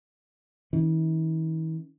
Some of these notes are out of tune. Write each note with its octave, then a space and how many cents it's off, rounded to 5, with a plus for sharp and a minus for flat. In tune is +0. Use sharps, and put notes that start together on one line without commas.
E3 -45 C#4 +0